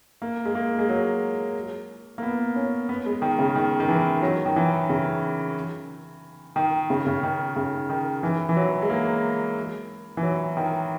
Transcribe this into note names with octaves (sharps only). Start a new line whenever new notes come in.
A#3
G#3
A#3
G#3
F#3
A#3
B3
C#4
B3
G#3
D#3
C#3
D#3
D#3
E3
F#3
D#3
E3
C#3
D#3
C#3
C#3
D#3
C#3
D#3
E3
E3
F#3
G#3
A#3
E3
F#3
D#3